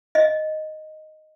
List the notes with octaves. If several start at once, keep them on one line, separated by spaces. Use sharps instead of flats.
D#5 E5